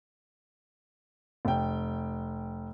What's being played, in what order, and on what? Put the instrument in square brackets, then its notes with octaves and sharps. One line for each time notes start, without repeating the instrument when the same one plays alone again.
[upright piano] F1 G5